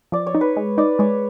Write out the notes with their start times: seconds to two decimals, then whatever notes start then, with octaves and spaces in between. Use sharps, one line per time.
0.12 F3 D5
0.26 C#5
0.35 D#4
0.41 B4
0.57 G#3
0.78 D#4 D5
0.99 G#3 C#5